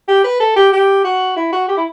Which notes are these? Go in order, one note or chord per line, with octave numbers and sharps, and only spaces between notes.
G4
B4
A4
G4
G4
F#4
E4
F#4
G4
E4